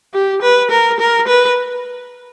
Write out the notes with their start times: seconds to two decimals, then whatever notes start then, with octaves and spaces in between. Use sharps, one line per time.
0.14 G4
0.42 B4
0.71 A#4
1.00 A#4
1.28 B4